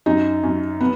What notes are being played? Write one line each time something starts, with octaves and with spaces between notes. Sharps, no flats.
F#2 D#4
F#2
B3